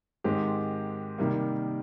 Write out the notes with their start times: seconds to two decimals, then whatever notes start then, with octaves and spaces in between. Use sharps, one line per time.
0.24 G#2 D#3 G#3 C4 G4
1.18 C3 D#3 G3 A#3